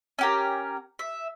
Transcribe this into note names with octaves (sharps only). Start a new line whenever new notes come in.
C#4 G4 A#4
E5